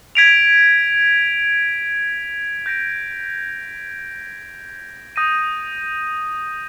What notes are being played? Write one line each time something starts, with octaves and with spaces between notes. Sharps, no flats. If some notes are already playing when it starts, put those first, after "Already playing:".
G#6 B6 D7 F7
G6 A#6 D7
D#6 G6 A#6 D#7